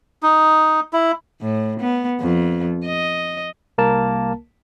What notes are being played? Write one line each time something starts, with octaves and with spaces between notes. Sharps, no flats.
D#4
E4
A2
B3
F2
D#5
C2 A#3 A#4 A5